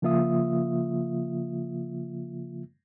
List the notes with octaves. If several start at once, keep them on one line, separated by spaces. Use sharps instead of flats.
C#3 F3 A#3 F4 E5 D#6